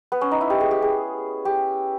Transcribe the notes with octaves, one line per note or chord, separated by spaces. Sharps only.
B3
C#4
D#4
E4
G4
G#4
G4
G#4
G4